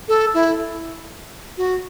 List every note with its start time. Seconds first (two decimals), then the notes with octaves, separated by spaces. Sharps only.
0.08 A4
0.34 E4
1.57 F#4